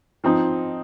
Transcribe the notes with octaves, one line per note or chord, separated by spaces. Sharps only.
F3 C4 D#4